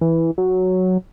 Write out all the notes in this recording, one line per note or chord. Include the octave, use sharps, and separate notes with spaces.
E3
F#3